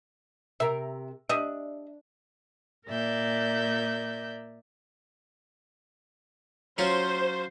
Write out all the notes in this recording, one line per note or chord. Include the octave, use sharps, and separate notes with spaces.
C3 A#4 E5
D4 G4 D#5 E5
A#2 A#4 D5 E5 G6
F#3 C#4 F4 C5